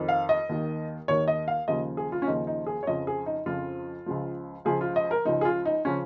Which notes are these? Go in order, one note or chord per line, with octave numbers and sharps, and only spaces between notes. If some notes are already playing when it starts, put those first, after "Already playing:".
Already playing: F2 D#3
F5
D#5
D#2 D#3
D#2 D#3 C#5
D#5
F5
D#2 C#3 F3 D#5
G#4
F4
C#4
D#2 C#3 F3 D#4
D#4
G#4
C#5
F2 C#3 F3 D#5
G#4
D#4
F2 C#3 F3 F4
C#2 C#3 F3
C#2 C#3 F3 G#4
F4
D#5
A#4
C#2 C#3 F3 D#4
G#4
F4
D#4
C#3 F3 C#4